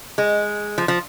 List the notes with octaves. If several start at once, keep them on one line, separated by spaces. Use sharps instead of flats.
G#3
F3
F3